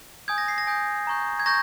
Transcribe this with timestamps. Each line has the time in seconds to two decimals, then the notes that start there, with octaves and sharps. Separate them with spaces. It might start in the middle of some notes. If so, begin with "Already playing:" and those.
0.28 G#5 D#6 G6 G#6
0.38 A#6
0.48 C7
0.58 A#6
0.67 G#5 D#6 G6
1.07 A#5 C#6 G6
1.40 G#6
1.46 A#5 C#6 G6 A#6